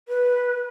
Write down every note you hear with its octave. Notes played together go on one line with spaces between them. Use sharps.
B4